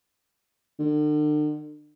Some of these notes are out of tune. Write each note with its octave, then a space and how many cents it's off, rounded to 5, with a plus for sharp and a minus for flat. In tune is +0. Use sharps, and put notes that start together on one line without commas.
D3 +40